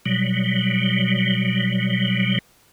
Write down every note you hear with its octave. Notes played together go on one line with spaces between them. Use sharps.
B2 F#3 G3